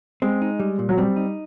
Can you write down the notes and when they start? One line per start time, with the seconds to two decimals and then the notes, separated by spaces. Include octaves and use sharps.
0.22 G#3 C4
0.42 D#4
0.60 G3
0.79 A#2
0.89 F#3
0.98 G3 C4
1.16 D#4